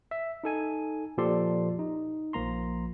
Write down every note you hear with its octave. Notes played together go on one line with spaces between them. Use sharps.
E5
D#4 A4 G#5
A#2 F3 G4 A4 D5 C6
D#4
A#1 F3 A#3 A#5 C6